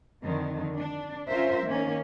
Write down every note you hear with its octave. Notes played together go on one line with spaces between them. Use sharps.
F2 D3 D#3
D4
C#4 F4 A#4 C5 E5
D#3 A#3 C#4